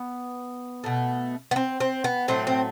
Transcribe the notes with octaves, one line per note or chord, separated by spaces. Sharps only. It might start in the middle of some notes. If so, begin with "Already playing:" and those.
Already playing: B3
B2 A3
B3
C4
C4
B3
A2 F#3 A3 C4
C4